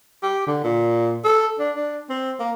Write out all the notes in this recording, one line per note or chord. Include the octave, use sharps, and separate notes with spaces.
G4
D3
A#2
A4
D4
D4
C4
A#3